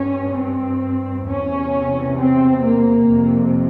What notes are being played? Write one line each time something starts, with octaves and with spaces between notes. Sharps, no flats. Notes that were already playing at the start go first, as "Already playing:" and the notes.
Already playing: G2 C#4
C4
E2 C3 C#4
C4
A#3
F2 C3